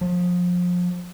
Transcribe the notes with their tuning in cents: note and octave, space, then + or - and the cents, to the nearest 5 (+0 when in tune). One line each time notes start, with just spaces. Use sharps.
F3 +30